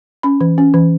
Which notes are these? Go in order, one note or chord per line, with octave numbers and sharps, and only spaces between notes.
C#4 B5
E3
C#4
E3